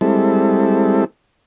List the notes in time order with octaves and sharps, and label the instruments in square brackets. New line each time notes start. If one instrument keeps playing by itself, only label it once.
[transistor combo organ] G3 G#3 C4 E4 A4